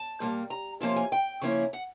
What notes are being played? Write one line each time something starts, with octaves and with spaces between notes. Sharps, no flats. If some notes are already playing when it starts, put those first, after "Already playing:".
Already playing: A5
A#2 G3 A#3
A#5
C3 F3 A#3 C#4 F4 A5
G#5
G5
C#3 F3 A#3 C#4 E4
F#5